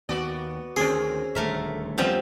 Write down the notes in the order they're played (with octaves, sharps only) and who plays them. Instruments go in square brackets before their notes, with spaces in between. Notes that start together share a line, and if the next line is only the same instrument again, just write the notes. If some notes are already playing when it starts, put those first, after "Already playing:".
[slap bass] D#2 [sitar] B3 F#4 D5
[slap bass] D2 D#3 [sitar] C4 C#4 [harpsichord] G#4
[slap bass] D#1 D2 D3 [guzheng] A3 A#4 E5
[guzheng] F#2 F3 G3 [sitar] B3 C4